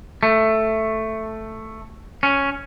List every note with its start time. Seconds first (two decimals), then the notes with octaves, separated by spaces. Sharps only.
0.23 A3
2.23 C#4